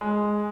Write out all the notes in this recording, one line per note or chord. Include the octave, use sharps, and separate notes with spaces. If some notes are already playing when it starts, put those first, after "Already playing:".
G#3